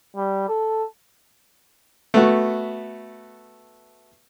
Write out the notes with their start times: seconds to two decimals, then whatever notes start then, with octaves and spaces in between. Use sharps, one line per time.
0.17 G3
0.49 A4
2.14 A3 B3 F#4